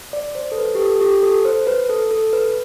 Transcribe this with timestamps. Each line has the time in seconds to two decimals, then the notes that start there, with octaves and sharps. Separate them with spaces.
0.13 D5
0.35 C5
0.52 A4
0.58 B4
0.75 G4
0.80 A4
1.01 G4
1.23 A4
1.45 C5
1.67 B4
1.89 A4
2.11 A4
2.33 B4